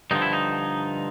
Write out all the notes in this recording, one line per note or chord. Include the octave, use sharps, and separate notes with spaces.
G2 D3 F3 D#4
E4
D#4